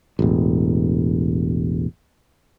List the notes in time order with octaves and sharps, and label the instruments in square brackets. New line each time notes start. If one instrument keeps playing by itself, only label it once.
[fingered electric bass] E1 A1